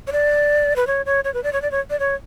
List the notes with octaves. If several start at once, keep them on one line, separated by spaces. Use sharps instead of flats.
C#5
D5
B4
C#5
C#5
C#5
B4
D5
C#5
D5
C#5
D5
C#5